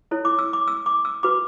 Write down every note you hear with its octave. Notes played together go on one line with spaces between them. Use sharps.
E4 A4 C#5
D6
E6
D6
E6
D6
E6
F#4 B4 D6